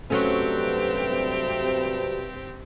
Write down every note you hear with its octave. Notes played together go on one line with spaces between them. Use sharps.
G2 C3 F#3 A3 C4 C#4 G4